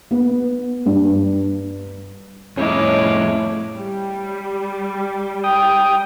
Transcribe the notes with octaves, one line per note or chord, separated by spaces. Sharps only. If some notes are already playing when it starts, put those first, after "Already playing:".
B3
G2
F2 A2 C#4 E4 C#5 D#5 D6
G3
G5 D#6